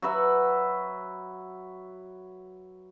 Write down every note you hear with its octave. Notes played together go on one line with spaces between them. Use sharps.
F#3 F#4 B4 E5